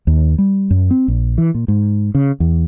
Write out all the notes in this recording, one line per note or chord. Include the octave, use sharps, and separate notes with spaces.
D#2
G3
F#2
C4
A#1
E3
A#2
G#2
C#3
E2